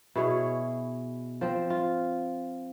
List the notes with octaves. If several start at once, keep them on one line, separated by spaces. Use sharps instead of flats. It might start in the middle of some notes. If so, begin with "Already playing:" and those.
B2 E4 G#4 C#5
F3 C4
F4